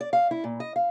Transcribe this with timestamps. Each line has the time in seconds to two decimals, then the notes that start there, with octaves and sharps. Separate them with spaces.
0.01 D5
0.13 F5
0.31 E4
0.44 A#2
0.60 D#5
0.76 F5